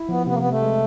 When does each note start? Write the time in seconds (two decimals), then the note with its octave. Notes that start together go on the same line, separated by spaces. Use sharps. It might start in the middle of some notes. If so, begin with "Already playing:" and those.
Already playing: E4
0.09 F3 B3
0.26 C3 B3
0.32 A#3
0.39 B3
0.44 C3
0.50 A3
0.62 G#3